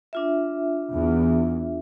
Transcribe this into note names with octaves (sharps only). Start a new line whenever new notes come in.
D4 F4 E5
E2